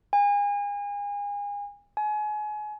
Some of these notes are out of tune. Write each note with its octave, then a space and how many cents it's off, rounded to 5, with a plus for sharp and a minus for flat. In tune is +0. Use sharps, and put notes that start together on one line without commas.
G#5 -35
G#5 +30